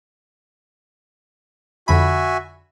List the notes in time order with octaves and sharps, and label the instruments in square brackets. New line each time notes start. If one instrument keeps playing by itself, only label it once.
[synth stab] F2 D3 B5 [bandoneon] F#4 E5 G#5